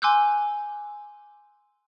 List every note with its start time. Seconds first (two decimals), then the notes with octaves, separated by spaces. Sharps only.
0.02 G#5 C6 D6 E6 F#6 G6